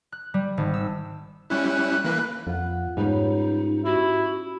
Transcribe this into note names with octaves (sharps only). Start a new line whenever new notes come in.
F#6
G3
G#1
E6
G3 C#4 E4 F#6
E3 A#3 B4
F2 F4 F#5
G#2 G3 B3 C#4 D#4
E4 F#4